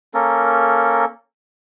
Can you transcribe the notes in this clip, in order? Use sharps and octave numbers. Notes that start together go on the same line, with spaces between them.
A#3 C#4 A4 A#4